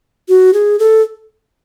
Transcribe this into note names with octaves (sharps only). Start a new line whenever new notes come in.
F#4
G#4
A4